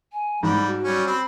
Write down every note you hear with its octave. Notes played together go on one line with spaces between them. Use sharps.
G#5
G#2 G3 B5
F#4
F#3 G3 C#4
C4 B5